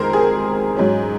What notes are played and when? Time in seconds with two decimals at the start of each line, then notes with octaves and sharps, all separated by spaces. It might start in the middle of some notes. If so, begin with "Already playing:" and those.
Already playing: F2 D#3 G#3 A#4 C5
0.13 G#4
0.77 G#2 F#3 C#4